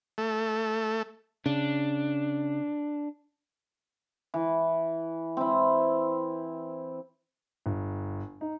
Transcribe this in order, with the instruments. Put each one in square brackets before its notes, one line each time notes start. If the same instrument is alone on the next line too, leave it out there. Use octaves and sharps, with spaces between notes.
[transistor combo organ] A3
[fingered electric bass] C#3 [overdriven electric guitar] D4
[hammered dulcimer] E3
C4 E4
[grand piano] G1
D#4